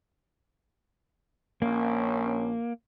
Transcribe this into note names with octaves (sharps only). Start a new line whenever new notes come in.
A#1 A#3 C#4